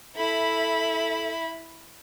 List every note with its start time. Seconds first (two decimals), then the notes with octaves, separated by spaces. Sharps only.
0.16 E4 A4 E5 B5